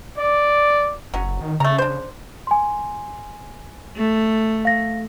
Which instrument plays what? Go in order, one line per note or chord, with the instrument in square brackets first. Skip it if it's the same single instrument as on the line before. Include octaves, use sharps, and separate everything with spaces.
[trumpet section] D5
[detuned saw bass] F#1 [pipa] F#3 C#4
[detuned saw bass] D#3
[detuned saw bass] C#3 [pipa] A3 A#5
[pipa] D4 C5
[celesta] G#5 C6
[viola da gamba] A3
[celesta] F5 A#6